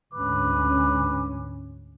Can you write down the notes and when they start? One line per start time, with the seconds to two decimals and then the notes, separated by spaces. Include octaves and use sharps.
0.14 D2 G#2 C#4 B4 D6